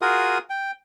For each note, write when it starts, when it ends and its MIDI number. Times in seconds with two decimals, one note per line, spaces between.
0.02 0.38 65
0.02 0.38 66
0.02 0.38 68
0.02 0.38 70
0.02 0.38 87
0.50 0.71 79